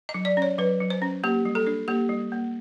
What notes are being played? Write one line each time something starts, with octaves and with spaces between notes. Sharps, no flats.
D#5
F#3
D5
C#4 C#5
F#3 B4
F#3
C5
C#4
A#3 G4
G3
A4
D4
A#3 G4
G3
A#3